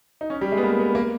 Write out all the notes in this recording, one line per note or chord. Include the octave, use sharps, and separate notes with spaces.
D#4
C#4
G3
G#3
B3
A#3
B3
A#3